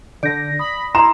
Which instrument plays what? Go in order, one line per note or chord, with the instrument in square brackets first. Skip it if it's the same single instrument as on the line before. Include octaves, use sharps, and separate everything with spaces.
[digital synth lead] D3 [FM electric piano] D5 A#6 [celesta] G6 D7
[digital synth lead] B5 [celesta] D#6
[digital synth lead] E4 [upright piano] A#5 C6 E7